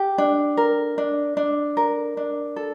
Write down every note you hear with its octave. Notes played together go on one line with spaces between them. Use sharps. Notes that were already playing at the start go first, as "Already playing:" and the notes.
Already playing: G4
D4
A#4
D4
D4
A#4
D4
A4